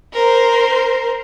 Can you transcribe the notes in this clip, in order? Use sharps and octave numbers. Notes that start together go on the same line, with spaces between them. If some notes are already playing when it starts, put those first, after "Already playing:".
A#4 C5